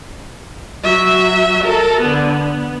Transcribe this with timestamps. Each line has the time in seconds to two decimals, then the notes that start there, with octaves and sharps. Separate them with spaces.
0.84 F#3 E5
1.64 A4 A#4
2.01 D3 B3
2.32 B3